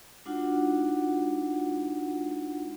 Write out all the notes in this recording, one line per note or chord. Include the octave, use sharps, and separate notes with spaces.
G#3 D4 D#4 F4 F#4 F#5